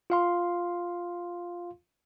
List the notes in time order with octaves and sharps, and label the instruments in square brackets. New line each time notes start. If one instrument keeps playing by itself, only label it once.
[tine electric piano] F4 F5 C6